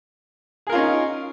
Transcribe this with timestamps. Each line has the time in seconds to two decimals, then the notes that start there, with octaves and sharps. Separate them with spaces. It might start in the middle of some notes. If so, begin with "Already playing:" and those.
0.67 G#4
0.69 A#4
0.72 F4
0.75 C#4
0.78 D#4